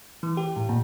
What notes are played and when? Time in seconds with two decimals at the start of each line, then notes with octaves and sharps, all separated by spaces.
0.23 E3
0.37 G4
0.56 A2
0.69 A#2